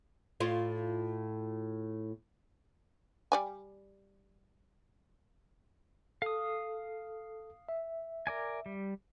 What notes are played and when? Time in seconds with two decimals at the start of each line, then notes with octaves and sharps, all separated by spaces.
0.40 A2 F4
3.32 G3 D5 G#5
6.22 A4 F5 D#6
7.69 E5
8.27 A#4 D5 G#5
8.66 G3